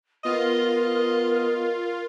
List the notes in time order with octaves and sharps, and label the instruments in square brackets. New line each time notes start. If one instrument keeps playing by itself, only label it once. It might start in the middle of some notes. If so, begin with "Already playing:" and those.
[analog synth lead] B3 [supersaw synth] F4 [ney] A#4 [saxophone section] D#5